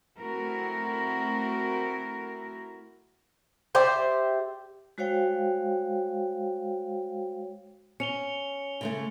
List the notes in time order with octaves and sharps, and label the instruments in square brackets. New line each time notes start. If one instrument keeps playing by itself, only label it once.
[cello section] A3 C4 E4 F#4 A#4
[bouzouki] G4 C5 D5 E5
[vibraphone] G#3 F#4 C5 C#5 F5 G5
[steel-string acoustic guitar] C#4 [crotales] C#7 F7 G7
[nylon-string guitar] C#3 G#3 A3